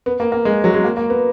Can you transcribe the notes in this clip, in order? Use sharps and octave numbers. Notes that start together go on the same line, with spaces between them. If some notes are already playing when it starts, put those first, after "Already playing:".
B3
A#3
A#3
G#3
F#3
G#3
A#3
A#3
B3